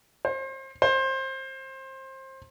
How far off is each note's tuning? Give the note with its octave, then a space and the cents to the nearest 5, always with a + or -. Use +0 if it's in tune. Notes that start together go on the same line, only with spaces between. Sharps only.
C5 +35
C5 +25